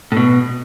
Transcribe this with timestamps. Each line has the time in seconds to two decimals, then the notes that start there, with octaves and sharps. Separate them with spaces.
0.12 A2
0.17 B2